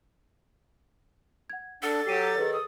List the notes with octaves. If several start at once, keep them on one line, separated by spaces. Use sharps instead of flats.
F#5 G#6
D4 A4 F#5 A6
F#3 G4 C7 D#7 E7
D#3 G#4 B4 C#5
D#6